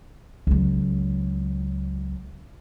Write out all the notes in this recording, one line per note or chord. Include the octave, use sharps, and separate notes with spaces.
C#2 F#3